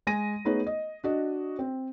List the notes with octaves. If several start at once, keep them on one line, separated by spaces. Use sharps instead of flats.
G#3 G#5 A#6 D#7
A3 B3 D#4 G#4 B4 C#5
D#5
D4 F#4 D#5
C4